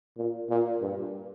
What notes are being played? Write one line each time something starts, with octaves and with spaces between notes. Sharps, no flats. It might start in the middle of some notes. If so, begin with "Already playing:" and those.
A#2
A#2
G2